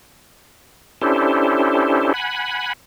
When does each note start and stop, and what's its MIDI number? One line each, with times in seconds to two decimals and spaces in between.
1.02 2.13 61
1.02 2.13 62
1.02 2.13 64
1.02 2.13 67
1.02 2.13 69
1.02 2.13 72
2.14 2.73 78
2.14 2.73 80
2.14 2.73 83